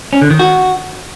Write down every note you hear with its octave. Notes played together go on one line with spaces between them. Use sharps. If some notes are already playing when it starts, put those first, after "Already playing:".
C#4
D3
D#3
F#4